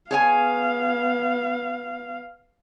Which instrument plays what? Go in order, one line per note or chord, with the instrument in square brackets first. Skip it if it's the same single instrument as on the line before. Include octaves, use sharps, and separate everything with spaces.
[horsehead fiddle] B3 F5 [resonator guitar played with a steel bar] G#4 C#5 G#5